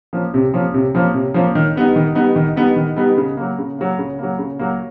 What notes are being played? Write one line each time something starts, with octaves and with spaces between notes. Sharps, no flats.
F3 A#3 C#4
C3
F3 A#3 C#4
C3
F3 A#3 C#4
C3
F3 A#3 C#4
D#3
G3 B3 D#4
D#3
G3 B3 D#4
D#3
G3 B3 D#4
D#3
G3 B3 D#4
C#3
F#3 A#3
C#3
F#3 A#3
C#3
F#3 A#3
C#3
F#3 A#3